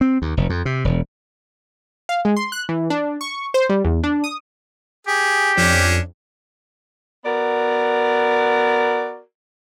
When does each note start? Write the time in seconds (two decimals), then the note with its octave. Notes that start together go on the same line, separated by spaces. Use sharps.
0.01 C4
0.22 D#2
0.37 F1
0.50 F2
0.65 C3
0.85 E1
2.09 F5
2.25 G#3
2.36 C6
2.52 F#6
2.69 E3
2.90 D4
3.21 C#6
3.54 C5
3.69 G3
3.85 E2
4.04 D4
4.24 D#6
5.07 G4 G#4
5.57 F2 C#4 D4
7.24 B3 F#4 A#4 D5